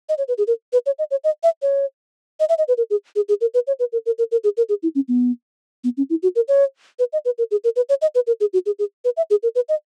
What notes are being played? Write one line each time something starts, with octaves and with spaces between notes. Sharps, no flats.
D#5
C#5
B4
G#4
A#4
B4
C#5
D#5
C#5
D#5
E5
C#5
D#5
E5
D#5
B4
A#4
G#4
G#4
G#4
A#4
B4
C#5
B4
A#4
A#4
A#4
A#4
G#4
A#4
G#4
E4
C#4
B3
B3
C#4
E4
F#4
A#4
C#5
B4
D#5
B4
A#4
G#4
A#4
B4
C#5
D#5
B4
A#4
G#4
F#4
G#4
G#4
B4
E5
G#4
A#4
B4
D#5